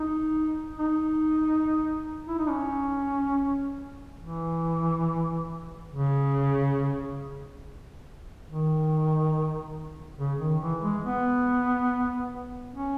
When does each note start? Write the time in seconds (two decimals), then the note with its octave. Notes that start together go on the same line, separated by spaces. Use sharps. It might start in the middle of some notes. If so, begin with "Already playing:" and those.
Already playing: D#4
0.78 D#4
2.28 E4
2.38 D#4
2.49 C#4
4.20 E3
5.91 C#3
8.48 D#3
10.19 C#3
10.40 D#3
10.61 E3
10.83 G#3
11.04 B3
12.75 C#4